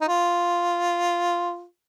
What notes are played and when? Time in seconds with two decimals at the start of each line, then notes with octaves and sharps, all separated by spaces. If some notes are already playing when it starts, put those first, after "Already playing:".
0.01 D#4
0.08 F4